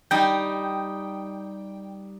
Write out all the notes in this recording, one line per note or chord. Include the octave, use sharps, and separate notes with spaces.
G3 D#4 G5